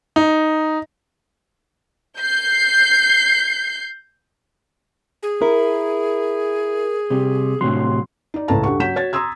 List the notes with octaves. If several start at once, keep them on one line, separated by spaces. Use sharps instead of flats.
D#4
G6 C7
G#4
E4 A#4
C3 G3
A2 C3 F#3 C6
D#4 D5
C#2 A2 A4 B4 A5 A#5
G2 G4 A4 F#5 C#6
F#3 C#4 F#5 G6 B6 E7
F#4 C#5 G#6 A6
A#5 C6 D#6 E6 G#6